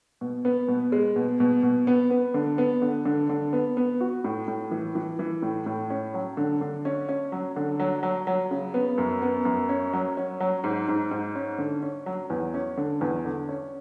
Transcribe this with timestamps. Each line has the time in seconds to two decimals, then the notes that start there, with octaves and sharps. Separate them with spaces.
0.21 B2
0.45 B3
0.68 B2
0.92 G#3
1.16 B2
1.40 B2
1.63 B2
1.87 B3
2.10 B3
2.34 D3
2.58 B3
2.82 D3
3.05 D3
3.29 D3
3.53 B3
3.77 B3
4.01 F#4
4.24 A2
4.48 A2
4.71 E3
4.95 E3
5.19 E3
5.42 A2
5.66 A2
5.90 C#4
6.14 F#3
6.37 D3
6.61 D3
6.85 C#4
7.09 C#4
7.32 F#3
7.56 D3
7.80 F#3
8.03 F#3
8.27 F#3
8.51 C#3
8.74 B3
8.98 F#2
9.22 B3
9.45 F#2
9.69 C#4
9.93 F#3
10.17 C#4
10.40 F#3
10.64 G#2
10.88 G#2
11.11 G#2
11.35 C#4
11.58 D3
11.83 C#4
12.06 F#3
12.30 E2
12.54 C#4
12.77 D3
13.01 E2
13.25 D3
13.49 C#4